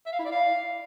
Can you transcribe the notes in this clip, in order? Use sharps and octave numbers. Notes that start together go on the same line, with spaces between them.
E5
F5
E4
D5
F5